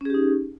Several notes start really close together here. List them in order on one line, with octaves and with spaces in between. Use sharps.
C#4 G#4 G4 D#4